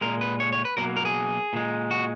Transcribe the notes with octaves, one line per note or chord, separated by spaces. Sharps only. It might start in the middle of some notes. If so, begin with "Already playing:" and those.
A#2 G#3 A#4
B4
C#5
C#5
B4
B2 F#3 A#3 A#4
A#4
G#4
A#2 G#3
F#4